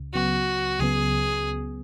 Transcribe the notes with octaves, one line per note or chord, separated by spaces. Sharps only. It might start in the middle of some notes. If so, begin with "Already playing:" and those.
Already playing: C#2 C#3
C#2 C#3 F#3 B3 F#4
C#2 C#3 F#3 B3 G#4